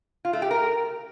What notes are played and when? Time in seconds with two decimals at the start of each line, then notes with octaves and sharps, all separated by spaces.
0.25 F4
0.33 A3
0.42 G4
0.51 A#4